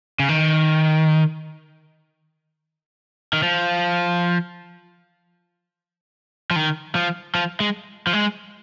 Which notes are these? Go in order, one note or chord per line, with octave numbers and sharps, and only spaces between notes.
C#3
D#3
D#3
F3
F3
D#3
F3
F3
G#3
F3
G#3